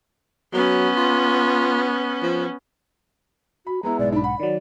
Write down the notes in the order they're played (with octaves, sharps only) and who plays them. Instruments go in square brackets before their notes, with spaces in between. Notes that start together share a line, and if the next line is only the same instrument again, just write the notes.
[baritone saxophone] F#3 [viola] B3 C#4
[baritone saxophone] F4
F3
[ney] F#4 [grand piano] B5
[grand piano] G#3 B3 E4 [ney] A#5
[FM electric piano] B1 G#2 [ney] D5
[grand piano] D4 B5 [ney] D#4
[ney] F#5 [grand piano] B5
[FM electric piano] D#3 F#3 [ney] D5